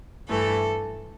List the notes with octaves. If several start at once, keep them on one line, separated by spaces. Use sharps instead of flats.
G2 E3 A3 A4